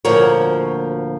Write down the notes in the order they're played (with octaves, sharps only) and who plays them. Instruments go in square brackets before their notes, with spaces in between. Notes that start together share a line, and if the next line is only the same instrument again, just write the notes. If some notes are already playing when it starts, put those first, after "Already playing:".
[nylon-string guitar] D2 A#2 F3 F#4 A#4 C#5